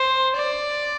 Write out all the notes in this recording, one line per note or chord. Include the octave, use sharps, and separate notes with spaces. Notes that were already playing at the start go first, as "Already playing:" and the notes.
Already playing: C5
D5